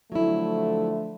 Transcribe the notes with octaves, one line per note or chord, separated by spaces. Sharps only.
D3 F3 F#3 A3 E4